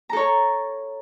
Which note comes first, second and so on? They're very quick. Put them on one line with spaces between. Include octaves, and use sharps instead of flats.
A#5 A4 C#5